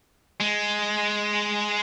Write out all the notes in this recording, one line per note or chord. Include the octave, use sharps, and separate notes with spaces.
G#3